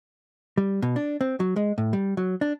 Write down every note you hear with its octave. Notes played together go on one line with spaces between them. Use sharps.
G3
B2
D4
C4
F#3
G#3
A2
G3
F#3
D4